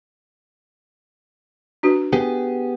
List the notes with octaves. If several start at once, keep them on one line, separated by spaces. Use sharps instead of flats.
D4 F#4 B4
B3 G4 G#4